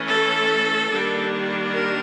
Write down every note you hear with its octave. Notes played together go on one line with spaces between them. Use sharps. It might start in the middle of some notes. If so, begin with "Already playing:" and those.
Already playing: E3 A3 C#4
A4
D#3 G3 A#3 D4
A#4